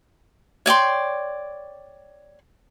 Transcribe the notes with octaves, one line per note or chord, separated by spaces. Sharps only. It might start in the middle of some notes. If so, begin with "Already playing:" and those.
C#5 D5 G5 C6